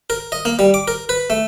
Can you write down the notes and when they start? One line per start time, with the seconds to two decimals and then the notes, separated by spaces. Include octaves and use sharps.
0.10 A#4
0.32 D#5
0.45 A#3
0.59 G3
0.74 D6
0.88 A#4
1.09 B4
1.30 A3